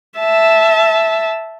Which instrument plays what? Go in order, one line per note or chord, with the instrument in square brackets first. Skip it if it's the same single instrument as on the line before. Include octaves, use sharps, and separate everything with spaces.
[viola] E5 A5